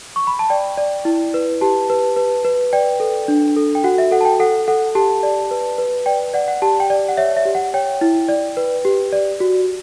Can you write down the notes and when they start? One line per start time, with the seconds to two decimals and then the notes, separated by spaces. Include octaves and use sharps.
0.16 C#6
0.27 B5
0.39 A5
0.50 D5 G5
0.77 D5
1.05 E4
1.34 B4
1.61 G4 A5
1.90 B4
2.16 B4
2.44 B4
2.73 D5 G5
3.00 A4
3.28 D4
3.56 A4
3.75 G5
3.84 F#4 F#5
3.98 E5
4.11 A4 F#5
4.21 A5
4.25 G5
4.40 A4 F#5
4.68 A4 F#5
4.95 G4 A5
5.23 D5
5.51 B4
5.78 B4
6.06 D5 G5
6.34 D5 F#5
6.48 F#5
6.62 G4 A5
6.80 G5
6.90 D5
7.09 F#5
7.17 C#5 E5
7.36 E5
7.45 G4
7.55 F#5
7.74 C#5 G5
8.01 E4
8.28 D5
8.57 B4
8.85 G4
9.12 D5
9.40 F#4